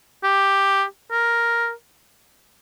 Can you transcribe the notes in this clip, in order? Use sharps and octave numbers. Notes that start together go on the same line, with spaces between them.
G4
A#4